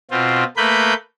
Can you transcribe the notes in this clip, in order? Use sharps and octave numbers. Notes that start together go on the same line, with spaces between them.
B2 C4 F4
A3 A#3 B4 B5 G6